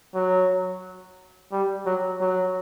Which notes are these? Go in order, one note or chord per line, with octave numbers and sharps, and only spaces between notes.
F#3
G3
F#3
F#3